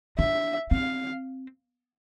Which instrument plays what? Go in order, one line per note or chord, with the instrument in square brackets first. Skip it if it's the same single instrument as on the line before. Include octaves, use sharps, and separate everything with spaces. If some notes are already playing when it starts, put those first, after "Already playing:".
[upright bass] D4 [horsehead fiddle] E5
[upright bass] C4 [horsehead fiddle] F5